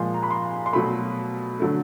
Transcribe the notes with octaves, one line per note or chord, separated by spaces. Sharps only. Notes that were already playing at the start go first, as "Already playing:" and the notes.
Already playing: A#2 F3 G#3 C6
A#5
B5
C6
C6
B2 F#3 A3 B5
D3 F#3 A3